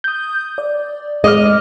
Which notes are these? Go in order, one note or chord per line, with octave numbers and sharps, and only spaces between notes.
D#6 G6
D5
G#3 D#5 D6 F6